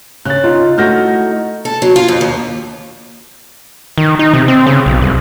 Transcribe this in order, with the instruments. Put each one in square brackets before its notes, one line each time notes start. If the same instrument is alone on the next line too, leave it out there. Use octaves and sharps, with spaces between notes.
[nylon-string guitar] C#3 [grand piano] F#6 A6
[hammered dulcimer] D#4 [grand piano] F4
[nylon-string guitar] A3 E4 F#4 [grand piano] F6 G6 A#6
[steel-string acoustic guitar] A4
F#3
F4
F2
D#2
[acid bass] D#3
D#4
C3
C4
C#3
B1
C2